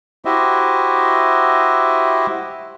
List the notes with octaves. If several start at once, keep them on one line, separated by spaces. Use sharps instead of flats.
E4 F#4 G4 C5 D#5 E5